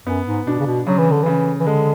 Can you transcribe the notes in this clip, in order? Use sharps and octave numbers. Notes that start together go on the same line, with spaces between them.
F#2 B3
G#2
B2 D4
C#3
B2
C#3 F#3
E3
D3
C#3 E3
E3
D3 G#3